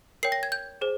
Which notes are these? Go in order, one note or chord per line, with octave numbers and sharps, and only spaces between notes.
A#4 C#5 G5 C7
A#6
G#6
G6
G#4 C5